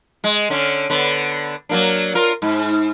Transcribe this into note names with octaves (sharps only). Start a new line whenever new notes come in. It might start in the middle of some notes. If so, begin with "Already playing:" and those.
G#3
D3 C#4
D3 B3
F#3 A#3 D4
F4 A#4
G#2